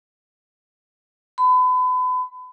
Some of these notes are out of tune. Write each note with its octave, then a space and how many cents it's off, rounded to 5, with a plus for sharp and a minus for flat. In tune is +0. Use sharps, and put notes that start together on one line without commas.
B5 +35